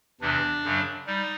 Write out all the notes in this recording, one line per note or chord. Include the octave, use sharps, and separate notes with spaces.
E2 C3 E3 D4
F#2 C#3 F#3
G3 D#4